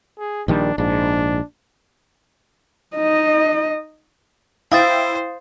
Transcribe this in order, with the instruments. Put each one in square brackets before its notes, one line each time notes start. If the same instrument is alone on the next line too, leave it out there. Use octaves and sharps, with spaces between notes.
[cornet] G#4
[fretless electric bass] A#1 D#3 G3 [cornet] D4
[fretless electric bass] A#1 G#2 [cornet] D4
[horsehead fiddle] D#4 D#5
[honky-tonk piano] E4 G5 [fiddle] C5 [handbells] F5 D#6 A6